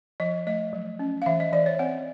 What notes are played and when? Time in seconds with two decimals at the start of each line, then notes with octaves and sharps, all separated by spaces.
0.20 F3 D#5
0.47 A3 D#5
0.73 F#3
0.99 C#4
1.22 F5
1.26 E3 E5
1.40 D#5
1.53 E3 D5
1.66 C#5
1.79 C4 F#5